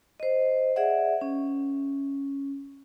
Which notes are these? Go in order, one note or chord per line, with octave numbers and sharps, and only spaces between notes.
C5 D#5
G#4 D5 E5 F#5
C#4